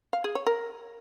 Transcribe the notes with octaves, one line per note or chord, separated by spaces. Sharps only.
F5
G#4
C#5
A#4